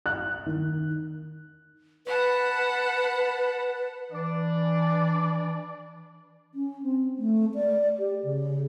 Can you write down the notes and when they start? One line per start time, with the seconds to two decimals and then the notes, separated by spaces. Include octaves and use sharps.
0.06 F#6
0.46 D#3
2.06 B4 F#5 A5 B5
4.12 E3 D4 D5
6.55 C#4
6.83 C4
7.18 A3
7.55 D5
7.99 G4
8.24 C#3